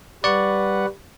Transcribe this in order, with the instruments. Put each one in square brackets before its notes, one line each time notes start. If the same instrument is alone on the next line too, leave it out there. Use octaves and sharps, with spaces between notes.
[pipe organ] G3 B4 F#5 [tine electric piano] D5 C#6